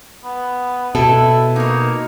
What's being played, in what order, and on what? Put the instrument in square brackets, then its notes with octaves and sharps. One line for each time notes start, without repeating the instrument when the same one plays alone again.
[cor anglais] B3
[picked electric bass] B2 [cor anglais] E4 [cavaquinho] A4
[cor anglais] A#3 [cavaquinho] D#4 C#5